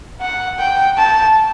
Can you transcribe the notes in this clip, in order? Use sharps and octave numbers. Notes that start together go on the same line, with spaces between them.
F#5
G5
A5